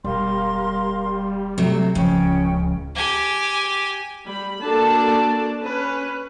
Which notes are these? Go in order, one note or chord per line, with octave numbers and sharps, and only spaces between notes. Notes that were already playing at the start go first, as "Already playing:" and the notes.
E1 G3 A#4 F5 C6
C3 F#3 A3
D1 C#3 F3 C#4 G5
C#2
G4 G#5
G3 B5
A#3 D4 F#4 A4 D5 A5
C#4 B4